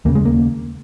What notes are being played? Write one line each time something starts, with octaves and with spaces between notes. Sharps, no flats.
D#2 C#3 A#3
G#3
A#3